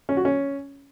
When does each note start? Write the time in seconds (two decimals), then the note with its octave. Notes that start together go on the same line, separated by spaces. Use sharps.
0.09 C#4
0.17 F#4
0.25 C#4